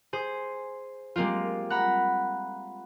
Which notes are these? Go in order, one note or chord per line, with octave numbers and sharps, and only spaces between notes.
G#4 C5
G3 G#3 A#3 C4 F4
F#5 A#5 B5